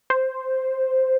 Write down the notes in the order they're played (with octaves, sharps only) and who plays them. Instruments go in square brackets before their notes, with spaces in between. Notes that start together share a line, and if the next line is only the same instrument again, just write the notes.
[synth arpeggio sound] C5